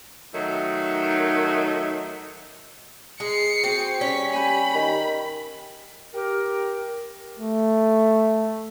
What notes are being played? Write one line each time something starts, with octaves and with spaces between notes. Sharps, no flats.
D#3 F#3 A3 D#4
G#3 C7 C#7
C4 F#4 G#4
G3 C#4 B6
G4 G#5 B5
D#3 G4
G4 A#4
A3